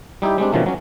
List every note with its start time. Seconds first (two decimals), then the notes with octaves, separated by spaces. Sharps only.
0.22 G3 D#4 E4 G4
0.38 G3 G#3 C4 D4
0.52 B2 D3 D#3 F3 A3 C#4
0.66 F#3 C#4